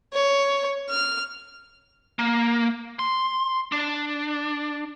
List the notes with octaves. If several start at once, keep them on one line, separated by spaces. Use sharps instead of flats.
C#5
F6
A#3
C6
D4